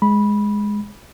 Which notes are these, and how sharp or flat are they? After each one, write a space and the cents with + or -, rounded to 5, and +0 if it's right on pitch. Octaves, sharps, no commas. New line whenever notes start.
G#3 +0 B5 -15